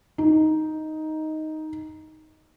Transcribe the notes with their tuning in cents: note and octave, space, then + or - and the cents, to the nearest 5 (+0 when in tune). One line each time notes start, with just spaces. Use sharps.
D#4 +5